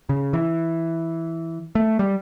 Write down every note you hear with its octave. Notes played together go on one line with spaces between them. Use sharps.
C#3
E3
A3
G3